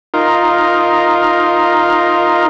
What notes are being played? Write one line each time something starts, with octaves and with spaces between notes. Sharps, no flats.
D#4 F4 A#4